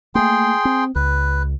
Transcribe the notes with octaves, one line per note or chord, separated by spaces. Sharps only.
A3 A#3 G#4 G5 C6
C4
C#2 B4